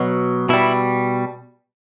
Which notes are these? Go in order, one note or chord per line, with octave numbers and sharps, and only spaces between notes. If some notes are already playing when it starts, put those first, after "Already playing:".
Already playing: B2 F#3
B2 G3 E4